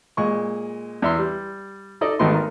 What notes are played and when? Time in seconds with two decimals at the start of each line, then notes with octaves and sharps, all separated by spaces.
0.17 A#2 G#3 C#6
1.02 E2 E5 C6
1.19 G3
2.01 D#4 A4 D5 D#5
2.19 G#1 D#3 A3 B3 D#4 C6
2.34 A#4